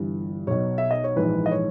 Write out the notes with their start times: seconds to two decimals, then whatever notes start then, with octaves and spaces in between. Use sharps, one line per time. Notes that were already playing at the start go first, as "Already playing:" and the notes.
Already playing: G1 G2 E3
0.47 B1 B2 C#5
0.78 E5
0.91 D#5
1.04 C#5
1.16 A#1 G#2 E3 B4
1.46 D#5
1.51 C#5